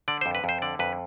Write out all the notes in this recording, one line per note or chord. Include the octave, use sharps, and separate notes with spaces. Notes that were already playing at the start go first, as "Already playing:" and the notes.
D3 D5
F2 C5
B4
F2 C5
D3 D5
F2 B4